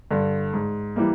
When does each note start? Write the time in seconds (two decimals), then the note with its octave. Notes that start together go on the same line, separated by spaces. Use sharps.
0.11 G2 D3
0.53 G#2
0.96 E3 G3 A#3